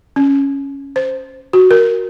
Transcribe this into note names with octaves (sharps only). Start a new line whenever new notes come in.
C#4
C5
F#4
A#4